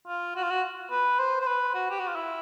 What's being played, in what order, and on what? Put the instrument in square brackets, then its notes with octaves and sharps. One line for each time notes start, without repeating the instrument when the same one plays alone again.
[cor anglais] F4
F#4
F4
F#4
B4
C5
C5
B4
F#4
G4
F#4
F4
E4